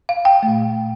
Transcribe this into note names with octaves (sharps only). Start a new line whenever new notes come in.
F5
G5
A#2 A3